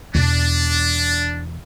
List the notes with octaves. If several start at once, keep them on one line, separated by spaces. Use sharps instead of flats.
E2 B2 D4